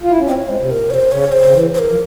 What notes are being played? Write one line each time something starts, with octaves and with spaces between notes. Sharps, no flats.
F4
E4
C#4
C4 D#5
C#5
G#3 C5
C3
A#2 A#4
C3 C#5
C5
C#3 C#5
C5
C#3
E3
C5
A#4
F3